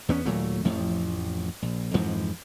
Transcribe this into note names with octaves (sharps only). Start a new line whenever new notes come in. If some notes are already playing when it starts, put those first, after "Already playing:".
E2 B3 C#4
D#2 A#2 F#3 A3
A1 F2 A2 F3
A#1
F2 G#2 E3 F3